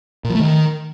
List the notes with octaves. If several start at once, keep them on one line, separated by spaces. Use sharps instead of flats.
A#2
F3
A3
D#3